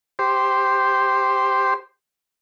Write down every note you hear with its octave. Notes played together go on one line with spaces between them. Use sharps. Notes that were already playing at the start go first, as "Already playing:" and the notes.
G4 C5